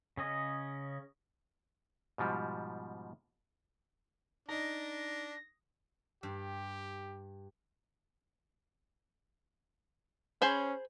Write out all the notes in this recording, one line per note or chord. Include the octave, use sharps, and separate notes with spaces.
C#3 C#4 D#5
G#2 B2 F3 G3
D4 D#4 A#6
G2 G4
C#4 G#4 C5 B5